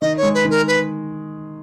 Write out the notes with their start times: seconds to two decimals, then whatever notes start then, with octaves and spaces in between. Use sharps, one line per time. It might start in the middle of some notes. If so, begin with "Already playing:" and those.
0.01 D#3 D#5
0.17 C#5
0.23 G#3
0.34 B4
0.45 D#3
0.50 A#4
0.68 B4